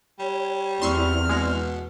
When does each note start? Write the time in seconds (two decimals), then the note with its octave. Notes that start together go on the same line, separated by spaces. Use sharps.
0.19 G3 C#5
0.82 E2 C4 E4 D5 C6 C#6 E6 F6
1.29 B2 G#3